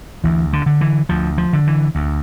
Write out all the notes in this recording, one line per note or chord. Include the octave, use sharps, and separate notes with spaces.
D2 E3
D3
D3
E3
D2 F3
F3
D3
E3
D2